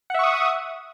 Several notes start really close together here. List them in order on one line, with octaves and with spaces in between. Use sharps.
F#5 E5 C#6 D#6